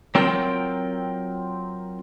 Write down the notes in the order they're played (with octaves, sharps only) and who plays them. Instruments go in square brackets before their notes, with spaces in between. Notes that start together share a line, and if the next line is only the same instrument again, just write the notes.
[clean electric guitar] F#3 C4 F4 A#4 G5